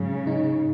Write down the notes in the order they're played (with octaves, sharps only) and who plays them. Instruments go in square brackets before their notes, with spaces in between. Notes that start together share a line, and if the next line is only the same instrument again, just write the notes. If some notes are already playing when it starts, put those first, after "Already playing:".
Already playing: [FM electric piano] G#2 F#3 [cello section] C#3
[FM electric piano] D#4